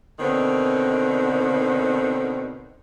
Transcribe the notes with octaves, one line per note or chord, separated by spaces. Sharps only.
B2 D3 D#3 C4 C#4